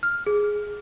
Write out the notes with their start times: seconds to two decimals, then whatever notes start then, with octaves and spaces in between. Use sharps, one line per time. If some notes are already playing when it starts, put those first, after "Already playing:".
0.03 F6
0.27 G#4